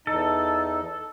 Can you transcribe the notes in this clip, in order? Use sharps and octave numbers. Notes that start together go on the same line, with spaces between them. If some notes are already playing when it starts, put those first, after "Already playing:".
E2 D#4 A4